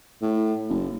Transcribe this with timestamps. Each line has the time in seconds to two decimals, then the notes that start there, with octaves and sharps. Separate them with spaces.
0.22 A2
0.70 F#1